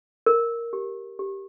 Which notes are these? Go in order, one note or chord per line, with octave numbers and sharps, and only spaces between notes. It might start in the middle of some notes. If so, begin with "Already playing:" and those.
A#4
G4
G4